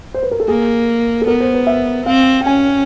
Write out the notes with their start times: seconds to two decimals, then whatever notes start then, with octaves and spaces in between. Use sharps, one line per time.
0.14 C5
0.23 B4
0.31 A#4
0.40 A4
0.48 A#3 G#4
1.22 A4
1.27 B3 A#4
1.40 C5
1.54 B4
1.67 E5
2.06 C4 F5
2.41 G5
2.46 C#4 G#5